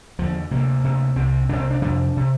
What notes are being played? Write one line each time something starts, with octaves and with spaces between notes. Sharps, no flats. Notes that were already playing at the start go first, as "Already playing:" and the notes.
E2 D3 F3
D2 C3 A#3
D2 C3
C2 C3 C4
C2 C3 D4
C4
D4
F2 C3 D4
C3